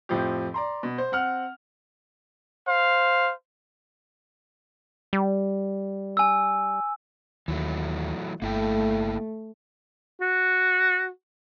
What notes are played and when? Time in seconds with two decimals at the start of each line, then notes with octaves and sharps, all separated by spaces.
0.09 F2 A2 F3 C4 G4
0.54 D5 A#5 C6
0.83 B2
0.98 C5
1.12 C4 F#5 F6
2.68 C5 F5
5.13 G3
6.17 G#5 E6
7.48 D#2 E3 F#3 A3
8.42 G1 A3 A#3 E4 G5
10.21 F#4